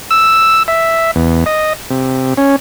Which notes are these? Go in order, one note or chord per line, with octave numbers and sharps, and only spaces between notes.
E6
E5
E2
D#5
C3
C#4